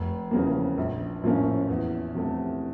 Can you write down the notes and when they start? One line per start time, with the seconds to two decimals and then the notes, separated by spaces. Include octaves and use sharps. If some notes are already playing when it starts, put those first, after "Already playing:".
Already playing: F1
0.31 E2 C#3 F3 A#3
0.78 A#1
1.23 A2 F3 A#3 C#4
1.68 E2
2.15 C3 F3 A3